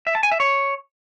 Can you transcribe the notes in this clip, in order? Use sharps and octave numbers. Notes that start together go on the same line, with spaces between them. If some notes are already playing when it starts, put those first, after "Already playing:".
E5
A5
G#5
E5
C#5